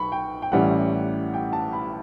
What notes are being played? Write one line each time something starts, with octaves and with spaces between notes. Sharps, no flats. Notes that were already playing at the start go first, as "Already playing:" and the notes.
Already playing: B1 B5 C#6
G5
G5
A1 A2 G3 C#4 F#5
G5
A5
B5